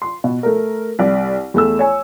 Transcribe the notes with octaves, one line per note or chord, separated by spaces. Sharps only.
C6
B2
A3 A#4
C2 D5
E2 A3 E6
C#5 G#5